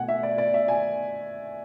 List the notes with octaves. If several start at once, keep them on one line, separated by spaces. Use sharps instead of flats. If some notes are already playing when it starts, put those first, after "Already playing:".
Already playing: B2 A3 F#5 G#5
E5
D5
D5
E5
G#5